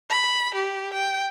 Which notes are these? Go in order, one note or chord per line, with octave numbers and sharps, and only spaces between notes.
B5
G4
G5